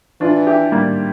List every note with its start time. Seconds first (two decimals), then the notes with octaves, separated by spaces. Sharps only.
0.21 E3 D4 F4
0.46 E4 G4
0.72 G3 A#3